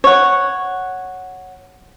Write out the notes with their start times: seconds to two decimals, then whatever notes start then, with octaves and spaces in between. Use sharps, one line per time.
0.04 C#5 F#5